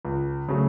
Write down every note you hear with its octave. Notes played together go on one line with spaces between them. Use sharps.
C#2
C#3 F#3 A3